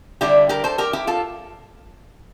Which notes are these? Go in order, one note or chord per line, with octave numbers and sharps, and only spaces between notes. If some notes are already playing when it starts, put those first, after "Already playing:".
D3 G3 D4 E4 G4
G4 A#4
A4 C5
G4 A#4
E4 G4
F4 A4